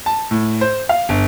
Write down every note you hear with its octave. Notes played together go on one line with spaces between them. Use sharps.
A5
A2
C5
F5
G1